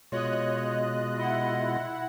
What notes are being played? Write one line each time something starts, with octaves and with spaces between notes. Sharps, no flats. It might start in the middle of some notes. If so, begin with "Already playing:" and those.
B2 G#3 F4 C#5 D#5 F#6
E4 D#5 F#5